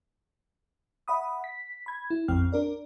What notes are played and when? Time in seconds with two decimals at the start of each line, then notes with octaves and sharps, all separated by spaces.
1.08 E5 F#5 B5 D#6
1.44 B6
1.86 B5 G#6
2.10 E4
2.28 A1 F2 C4 G5 F6
2.52 D4 A#4 D5